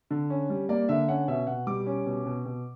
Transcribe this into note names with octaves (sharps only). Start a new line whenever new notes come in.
D3
C#4
G3
A#3 D5
D3 E5
C#4 F#5
B2 E5
B2 F#5
G3 D6
C#4
B2
B2
B2